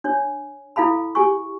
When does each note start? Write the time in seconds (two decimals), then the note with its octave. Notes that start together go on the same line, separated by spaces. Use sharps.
0.04 D4 C#5
0.76 E4 A4 F5 A5 B5
1.15 G4 G#4 G#5 C#6